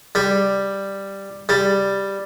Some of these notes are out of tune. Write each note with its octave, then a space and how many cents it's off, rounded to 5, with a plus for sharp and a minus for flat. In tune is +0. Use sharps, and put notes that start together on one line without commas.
G3 +5
G3 +5